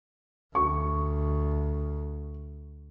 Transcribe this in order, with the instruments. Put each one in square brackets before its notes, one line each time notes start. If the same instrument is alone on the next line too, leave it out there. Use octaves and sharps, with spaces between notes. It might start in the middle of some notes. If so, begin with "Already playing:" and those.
[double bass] D2 [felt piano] C#6